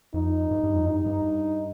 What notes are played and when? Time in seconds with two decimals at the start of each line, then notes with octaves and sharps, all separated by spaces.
0.14 F2 D#4
0.51 G2
0.64 G2
0.75 F2
0.87 G2 D#4
1.06 G2